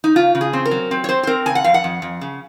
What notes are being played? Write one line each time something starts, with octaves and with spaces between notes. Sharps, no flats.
D#4
C#3 F4
C#3
G#4
C4
A#4
F#3
C4
C#5
C4 C5
C5
C4 A#4
C#3 G#5
F#5
F2 F5
F#5
F2
F2
C#3